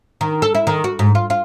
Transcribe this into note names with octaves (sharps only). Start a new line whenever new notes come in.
D#3
A4
E4
D#3
F#4
G#2
F4
F4